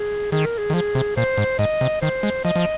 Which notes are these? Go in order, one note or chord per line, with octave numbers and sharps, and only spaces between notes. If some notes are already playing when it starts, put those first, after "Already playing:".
Already playing: G#4
D#3 G#4
A#4
G#4
D#3
F3 G#4
C3
A#2 C5
G#2
G#2 D#5
C3
D#3 C5
G#3
F3 D#5
F3